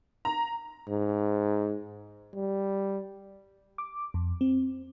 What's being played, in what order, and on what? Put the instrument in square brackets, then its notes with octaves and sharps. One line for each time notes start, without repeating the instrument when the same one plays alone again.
[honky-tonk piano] A#5
[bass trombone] G#2
G3
[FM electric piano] D6
F2
C4